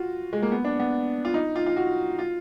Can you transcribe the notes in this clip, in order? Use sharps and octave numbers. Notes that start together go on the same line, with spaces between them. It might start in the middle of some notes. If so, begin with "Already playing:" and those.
Already playing: F4 F#4
G#3
A#3
B3
D4
B3
F4
D#4
F4
F4
F#4
F4